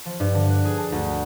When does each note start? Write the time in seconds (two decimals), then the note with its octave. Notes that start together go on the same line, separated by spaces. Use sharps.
0.06 F3
0.20 G2
0.35 D3
0.50 F#6
0.65 G#4
0.78 A5
0.92 D2